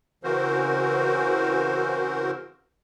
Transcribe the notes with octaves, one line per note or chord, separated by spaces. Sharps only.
C#3 E3 C4 F#4 A#4 C5